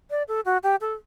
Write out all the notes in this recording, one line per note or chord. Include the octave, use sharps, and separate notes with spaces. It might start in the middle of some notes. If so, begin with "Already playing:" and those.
D5
A4
F#4
G4
A4